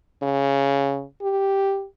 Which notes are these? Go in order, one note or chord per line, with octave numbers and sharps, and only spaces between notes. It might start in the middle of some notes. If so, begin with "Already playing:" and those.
C#3
G4